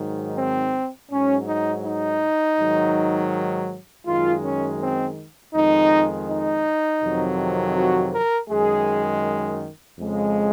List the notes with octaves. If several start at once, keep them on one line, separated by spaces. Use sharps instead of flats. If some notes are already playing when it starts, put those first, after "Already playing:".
Already playing: G#2 D#3 F#3
C4
G#2 F#3 C#4
D#4
D#4
G#2 D#3 F#3
F#2 D#3 G#3 F4
C#4
C4
F2 D#3 G#3 D#4
D#4
F2 C3 D#3 F#3
F#4
A#4
F#2 D#3 G#3 G#4
F2 C#3 G#3